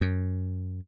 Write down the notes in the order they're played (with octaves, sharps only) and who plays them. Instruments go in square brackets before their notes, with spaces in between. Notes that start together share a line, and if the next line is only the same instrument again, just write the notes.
[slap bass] F#2